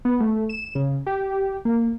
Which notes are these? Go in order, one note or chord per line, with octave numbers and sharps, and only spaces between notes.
B3
A3
E7
C#3
G4
A#3